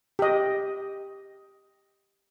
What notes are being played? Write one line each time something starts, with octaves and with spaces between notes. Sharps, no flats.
G4 D#5